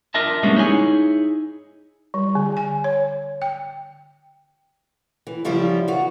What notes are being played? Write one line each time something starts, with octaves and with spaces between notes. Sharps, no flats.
D4 F4 A#4 D#5 E5 A5
G3 G#3 A#3 B3 C#4 D4
D#4 E4 G#4 C#5 G5 G#5
G3
D3
G#5
C#5
G5
E3
C#3 F3 G3 E4 F4
E3 F4 F#4